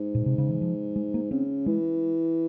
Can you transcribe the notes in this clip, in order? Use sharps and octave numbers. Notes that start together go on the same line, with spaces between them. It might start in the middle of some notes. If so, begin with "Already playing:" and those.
Already playing: G#2
A#2
C3
C#3
E3
F3
G#3
A#3
C#3 C4
E3 G#3